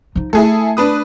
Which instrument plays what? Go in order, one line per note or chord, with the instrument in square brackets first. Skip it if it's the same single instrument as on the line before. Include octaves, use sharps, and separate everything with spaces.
[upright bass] F3 D#4
[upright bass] A3 [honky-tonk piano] E4 G#4 A4
[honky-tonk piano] D4 B4 D#6